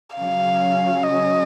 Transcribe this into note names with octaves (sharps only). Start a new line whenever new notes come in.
C#3 F#3 C#4 F5
D#5